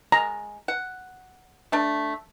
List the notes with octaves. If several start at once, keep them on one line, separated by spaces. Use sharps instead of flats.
G#3 A#5
F#5
A3 D4